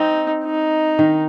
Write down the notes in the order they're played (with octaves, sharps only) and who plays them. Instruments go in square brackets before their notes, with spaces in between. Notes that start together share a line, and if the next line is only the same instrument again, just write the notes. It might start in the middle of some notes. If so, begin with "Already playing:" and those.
Already playing: [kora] C4 [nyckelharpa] D#4
[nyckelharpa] D#4
[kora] D#3